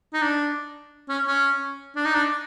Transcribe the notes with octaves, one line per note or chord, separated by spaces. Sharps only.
D#4
D4
C#4
C#4
D4
D#4
D4